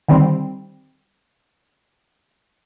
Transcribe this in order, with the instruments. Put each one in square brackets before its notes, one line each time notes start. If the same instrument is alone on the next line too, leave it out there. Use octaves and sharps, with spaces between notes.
[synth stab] D3 D#3 G3 C4